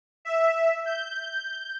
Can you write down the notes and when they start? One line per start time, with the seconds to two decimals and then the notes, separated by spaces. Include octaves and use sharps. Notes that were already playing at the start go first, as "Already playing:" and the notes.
0.25 E5
0.85 G6